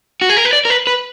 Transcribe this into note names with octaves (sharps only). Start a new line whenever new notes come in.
F#4
G#4
A#4
B4
D5
A#4
B4
B4